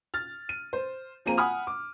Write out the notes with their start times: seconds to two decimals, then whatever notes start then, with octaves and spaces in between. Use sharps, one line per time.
0.14 F6 A6
0.49 D#7
0.73 C5
1.26 F3 A#3 C4 G#4 A#5 D#7
1.37 F#5 G#5 B5 D#6 F6
1.67 D6